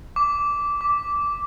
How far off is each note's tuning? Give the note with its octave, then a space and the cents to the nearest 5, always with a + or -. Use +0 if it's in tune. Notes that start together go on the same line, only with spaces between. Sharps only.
D6 -15
D6 -10